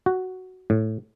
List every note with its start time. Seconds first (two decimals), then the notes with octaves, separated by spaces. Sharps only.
0.06 F#4
0.70 A2